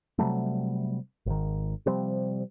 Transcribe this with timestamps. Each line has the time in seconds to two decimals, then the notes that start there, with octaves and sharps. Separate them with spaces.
0.18 C3 F#3 G3 A3
1.26 G#1 D#3
1.86 C3 F3 G3 C4